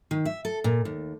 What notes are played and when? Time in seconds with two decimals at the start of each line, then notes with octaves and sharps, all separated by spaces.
0.11 D#3
0.25 E5
0.45 A4
0.64 A#2
0.85 D#2